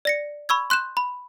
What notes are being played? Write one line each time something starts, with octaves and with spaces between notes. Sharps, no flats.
D5 A#6 C#7
B5 C#6 E6 G#6
C6 F#6 G6 E7
B5